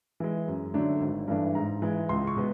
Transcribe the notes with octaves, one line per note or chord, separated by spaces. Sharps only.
E3 G#3
F#2
D3 F#3 A3 D4
G#1
G2 E3 A3 D4
G#2 A#5
E3 G#3
C#2 C6
C#6
B2 G#3 B3